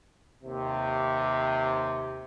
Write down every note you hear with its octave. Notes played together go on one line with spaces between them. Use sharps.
D#2 C3